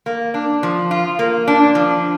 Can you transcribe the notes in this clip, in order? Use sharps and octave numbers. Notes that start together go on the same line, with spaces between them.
A#3
D4
F3
F4
A#3
D4
F3